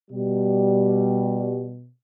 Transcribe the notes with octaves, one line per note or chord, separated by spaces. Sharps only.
B2 G3